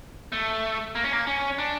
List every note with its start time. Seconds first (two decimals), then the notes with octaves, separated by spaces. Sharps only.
0.32 A3
0.95 A#3
1.04 C#4
1.13 A#3
1.27 C#4
1.58 D4